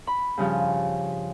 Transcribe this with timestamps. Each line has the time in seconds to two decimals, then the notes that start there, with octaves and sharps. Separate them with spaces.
0.07 B5
0.38 G2 C#3 F3